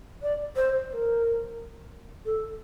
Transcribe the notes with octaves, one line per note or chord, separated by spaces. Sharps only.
D5
C5
C5
A#4
A4